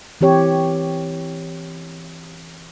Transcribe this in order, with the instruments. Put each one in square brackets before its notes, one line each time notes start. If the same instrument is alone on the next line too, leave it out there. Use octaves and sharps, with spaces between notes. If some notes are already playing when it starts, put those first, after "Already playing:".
[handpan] E3 C4 G4 C#5